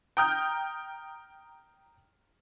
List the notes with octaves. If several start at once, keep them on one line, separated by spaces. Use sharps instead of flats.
G5 A#5 D#6 F6 G6